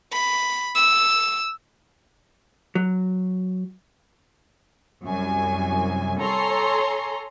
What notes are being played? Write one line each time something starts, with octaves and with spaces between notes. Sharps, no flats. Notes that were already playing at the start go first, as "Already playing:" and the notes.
B5
E6
F#3
C2 F#2 G#5
A4 C#5 G#5 A#5 C6